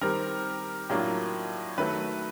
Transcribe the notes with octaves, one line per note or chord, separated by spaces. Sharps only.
D#3 G3 C4 A#4
A2 F#3 A#3 D4 F4
D#3 F#3 A3 B4